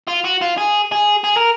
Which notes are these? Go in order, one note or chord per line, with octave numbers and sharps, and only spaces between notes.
F4
F#4
F4
G#4
G#4
G#4
A#4